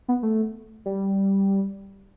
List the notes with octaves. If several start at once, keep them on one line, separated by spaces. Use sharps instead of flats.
B3
A3
G3